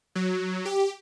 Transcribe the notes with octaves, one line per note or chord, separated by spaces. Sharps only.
F#3
G4